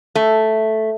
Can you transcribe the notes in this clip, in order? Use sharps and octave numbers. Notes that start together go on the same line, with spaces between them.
A3